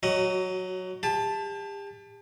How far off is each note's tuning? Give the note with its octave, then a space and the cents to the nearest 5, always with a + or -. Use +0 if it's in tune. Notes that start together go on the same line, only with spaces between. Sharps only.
F#3 +0 F#4 +25 D#5 +0
G4 +40 A5 +0